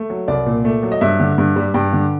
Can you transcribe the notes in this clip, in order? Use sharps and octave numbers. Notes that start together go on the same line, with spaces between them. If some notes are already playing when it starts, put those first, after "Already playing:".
Already playing: A3
F#3
C2 D5
A#2
A3
F#3
D#5
G2 E5
D3
G2
G3
G2 G5
D3